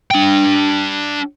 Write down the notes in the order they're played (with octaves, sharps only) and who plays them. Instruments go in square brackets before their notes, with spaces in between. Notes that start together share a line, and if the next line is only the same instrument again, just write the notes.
[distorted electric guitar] D4 G5